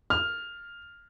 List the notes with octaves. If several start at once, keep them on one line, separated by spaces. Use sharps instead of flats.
F6